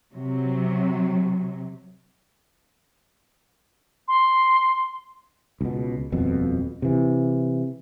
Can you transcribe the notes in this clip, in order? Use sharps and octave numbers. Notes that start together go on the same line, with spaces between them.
C3 F#3
C6
C#2 B2
D#1 F2 B2
C3 E3